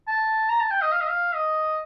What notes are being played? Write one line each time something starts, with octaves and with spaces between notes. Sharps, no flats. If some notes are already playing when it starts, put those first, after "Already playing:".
A5
A#5
A5
G5
D#5
F5
D#5
F5
D#5